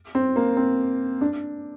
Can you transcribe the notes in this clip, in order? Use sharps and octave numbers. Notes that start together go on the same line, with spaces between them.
C4
A#3
C4
D4